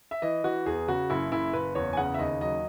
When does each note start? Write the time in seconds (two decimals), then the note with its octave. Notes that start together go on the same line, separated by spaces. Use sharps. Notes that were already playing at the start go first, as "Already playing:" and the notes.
0.11 E5
0.22 E3 D#5
0.44 E3 F#4
0.66 E2 G#4
0.88 C#3 F#4
1.10 F#1 E4
1.32 F#1 E4
1.53 F#1 B4
1.75 E2 C#5
1.93 G#5
1.97 C#3 F#5
2.14 E5
2.19 D#2 D#5
2.41 F#3 D#5